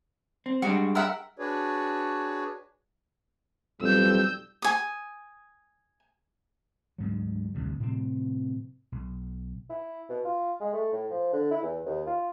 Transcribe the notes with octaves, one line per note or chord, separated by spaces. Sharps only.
C4
G3 G#3 D4 F#4
A#4 E5 F#5
D4 F#4 G#4 B4 C#5 D5
B1 F2 G3 E6 G6
G#5 D#6
D2 G#2 F#3
A1 D2 G2 C3
A2 C3 F3 C4
B1
E4
B2
F4
G#3
A3
A2
F3
D3
E4
E2
D#2
F4